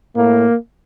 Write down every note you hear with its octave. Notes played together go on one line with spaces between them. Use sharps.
A2 A#3